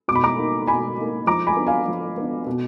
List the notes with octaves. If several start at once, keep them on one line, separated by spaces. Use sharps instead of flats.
B2 D6
B5
A#5 D6
A#3 D#4
B2 G#5 B5
A#3 D#4
F3 A#5 D6
G#5 B5
B3 D4
F5 G#5
F3
B3 D4
B2